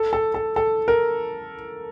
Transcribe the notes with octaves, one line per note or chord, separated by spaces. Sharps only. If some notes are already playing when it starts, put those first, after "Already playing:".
Already playing: A4
A4
A4
A4
A#4